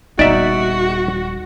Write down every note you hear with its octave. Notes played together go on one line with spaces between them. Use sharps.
D#1 B3 D#4 F#4 D5 E5